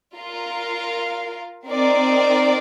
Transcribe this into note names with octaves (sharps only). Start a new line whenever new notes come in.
F4 A#4 F5
C4 D#4 A#4 D5